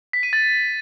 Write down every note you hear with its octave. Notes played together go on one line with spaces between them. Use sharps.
B6
D#7
A6